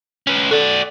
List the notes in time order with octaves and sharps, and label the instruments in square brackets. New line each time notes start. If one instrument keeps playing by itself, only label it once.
[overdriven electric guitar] C#4 B4
[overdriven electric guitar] F#4 D5 [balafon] A4